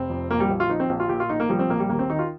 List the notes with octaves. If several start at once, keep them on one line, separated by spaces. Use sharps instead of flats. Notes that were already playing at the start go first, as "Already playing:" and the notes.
Already playing: F1 C4
F2
A#1 A#3
G3
A#1
F4
F3 D#4
C4
A#1
F4
A#2 G4
F4
A#1 D#4
A#3
F3 G3
C4
A#1 A#3
G3
D#2 A#3
C4
D#3 D#4
F4